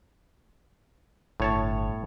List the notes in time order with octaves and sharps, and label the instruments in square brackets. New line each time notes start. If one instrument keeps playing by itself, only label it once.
[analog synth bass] G1 [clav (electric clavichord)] A2 C#5 A5